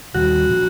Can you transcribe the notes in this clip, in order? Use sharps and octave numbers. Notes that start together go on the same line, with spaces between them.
D#2 D#3 G3 C4 F#4
A#2 F3